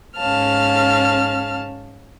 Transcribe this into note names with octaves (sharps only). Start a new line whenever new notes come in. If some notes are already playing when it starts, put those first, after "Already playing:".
G#2 C#4 F5 A5 F6